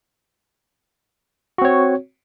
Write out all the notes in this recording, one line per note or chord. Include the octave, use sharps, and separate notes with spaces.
C4 F#4 C#5